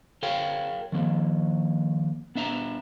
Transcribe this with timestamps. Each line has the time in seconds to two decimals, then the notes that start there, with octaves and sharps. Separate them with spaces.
0.23 G#4 A#4 C#5 F5 G5
0.92 D#3 F3 A#3
2.35 B3 D4 E5 A#5